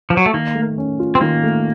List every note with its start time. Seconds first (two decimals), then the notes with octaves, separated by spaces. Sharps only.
0.10 F3
0.17 F#3
0.26 A3
0.33 D#3 A#3
0.55 A3
0.78 C#4
0.99 F4
1.15 C4
1.21 D#3 A#3
1.43 A3